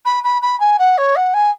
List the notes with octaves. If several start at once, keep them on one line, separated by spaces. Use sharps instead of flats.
B5
B5
B5
G#5
F#5
C#5
F#5
G#5